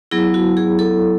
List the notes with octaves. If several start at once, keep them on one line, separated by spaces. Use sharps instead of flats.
F#3 B3 E4 G#4
F#4
G#4
A4